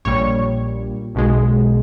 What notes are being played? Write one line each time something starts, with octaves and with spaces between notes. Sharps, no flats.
A#1 A#2 G3 C#5 C#6
B1 B2 G#3